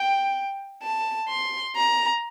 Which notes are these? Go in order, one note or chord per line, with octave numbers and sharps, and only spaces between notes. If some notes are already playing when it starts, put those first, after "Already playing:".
Already playing: G5
A5
C6
A#5